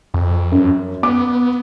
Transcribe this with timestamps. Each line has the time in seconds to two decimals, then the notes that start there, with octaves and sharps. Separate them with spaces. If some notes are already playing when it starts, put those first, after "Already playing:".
0.14 F2
0.52 F#2
1.03 B3 D6